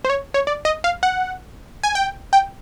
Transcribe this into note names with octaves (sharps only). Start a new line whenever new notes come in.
C5
C#5
C#5
D5
D#5
F5
F#5
G#5
G5
G5